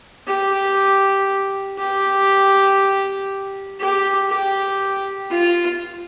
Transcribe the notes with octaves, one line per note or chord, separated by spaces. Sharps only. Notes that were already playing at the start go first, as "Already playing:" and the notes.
G4
G4
G4
G4
F4